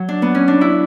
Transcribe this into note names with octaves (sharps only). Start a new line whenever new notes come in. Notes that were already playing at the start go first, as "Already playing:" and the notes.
Already playing: F#3
D4
B3
C#4
D4
E4